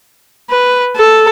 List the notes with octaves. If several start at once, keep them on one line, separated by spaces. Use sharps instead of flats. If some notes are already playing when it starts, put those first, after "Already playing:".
B4
A4